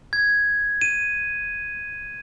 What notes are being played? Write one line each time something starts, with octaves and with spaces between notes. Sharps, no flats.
G#6
D#7